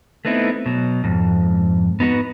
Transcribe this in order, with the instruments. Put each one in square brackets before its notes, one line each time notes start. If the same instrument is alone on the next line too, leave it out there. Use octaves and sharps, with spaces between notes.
[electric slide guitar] A3 B3 C4 D#4 E4
B2 F#3
F2 G#2
B3 D#4 F#4 B4